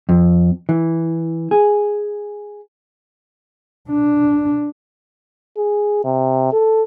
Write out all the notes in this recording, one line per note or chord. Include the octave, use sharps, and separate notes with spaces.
F2
E3
G#4
D4
G#4
C3
A4